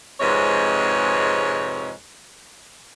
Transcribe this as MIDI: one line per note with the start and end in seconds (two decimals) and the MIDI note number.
0.20 1.91 41
0.20 1.91 44
0.20 1.91 48
0.20 1.91 56
0.20 1.91 71
0.20 1.91 73